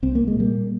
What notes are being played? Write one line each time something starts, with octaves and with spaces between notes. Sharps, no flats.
C2 C4
A#3
G#3
A#2
G3 A#3